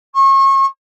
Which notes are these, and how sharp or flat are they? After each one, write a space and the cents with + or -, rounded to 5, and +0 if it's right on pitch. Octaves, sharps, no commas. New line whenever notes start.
C#6 -35